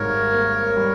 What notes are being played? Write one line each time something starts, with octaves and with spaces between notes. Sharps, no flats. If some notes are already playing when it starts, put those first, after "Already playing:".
Already playing: G#1 G#2 G3 A#4 C#5
A#3
G3